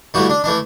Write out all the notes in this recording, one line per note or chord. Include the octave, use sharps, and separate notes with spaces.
G2 E3 A3 F#4
D4
E3 A3 D4